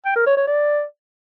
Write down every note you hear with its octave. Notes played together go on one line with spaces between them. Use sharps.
G5
A#4
C#5
C#5
D5